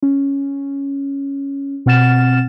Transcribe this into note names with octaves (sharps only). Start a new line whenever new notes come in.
C#4
B2 C4 F#5 F6 A6 E7